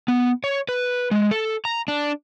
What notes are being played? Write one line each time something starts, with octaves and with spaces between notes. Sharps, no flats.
B3
C#5
B4
G#3
A4
A#5
D4